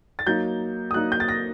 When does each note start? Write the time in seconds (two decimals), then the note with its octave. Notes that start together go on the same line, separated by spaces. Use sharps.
0.19 A6
0.27 F#3 A#3 D#4 G6
0.91 D#6
0.94 F#3 A#3 D#4 F#6
1.12 G6
1.20 A6
1.28 A#6